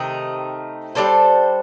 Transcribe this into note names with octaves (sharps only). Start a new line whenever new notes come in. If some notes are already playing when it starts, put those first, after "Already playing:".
Already playing: C3 D#3 A3 D#4
G3 D4 A4 C5